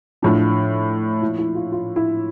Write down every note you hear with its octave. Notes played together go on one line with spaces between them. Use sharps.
A2 F3 D4
A#2 F3 E4
E4
F4
F4
E4